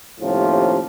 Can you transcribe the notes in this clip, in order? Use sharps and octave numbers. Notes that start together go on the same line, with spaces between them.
D#2 A2 C3 F3 C#4